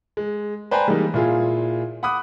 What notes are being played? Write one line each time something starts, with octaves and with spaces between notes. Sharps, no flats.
G#3
B4 C5 D5 G5 G#5 A#5
E3 G3 G#3 A#3 D#4
A#2 E4 F4 G#4
F#5 B5 D6 D#6 F#6